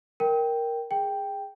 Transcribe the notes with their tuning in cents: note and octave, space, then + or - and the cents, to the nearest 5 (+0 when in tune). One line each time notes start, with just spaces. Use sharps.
A#4 +5 G5 +0
G#4 -10 G5 +5